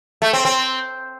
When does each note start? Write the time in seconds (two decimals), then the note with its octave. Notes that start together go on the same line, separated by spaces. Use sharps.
0.22 A3
0.33 C4
0.45 C4